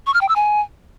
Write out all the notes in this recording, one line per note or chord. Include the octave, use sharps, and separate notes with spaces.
C#6
F6
G5
E6
G#5